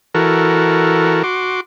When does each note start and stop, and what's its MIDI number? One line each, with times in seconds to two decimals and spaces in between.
0.15 1.23 52
0.15 1.23 66
0.15 1.23 69
0.15 1.23 70
1.23 1.61 66
1.23 1.61 84
1.23 1.61 86